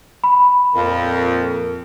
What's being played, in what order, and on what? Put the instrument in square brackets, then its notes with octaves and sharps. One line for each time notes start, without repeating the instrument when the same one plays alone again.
[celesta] B5
[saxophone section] F2 [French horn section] A#2 A#4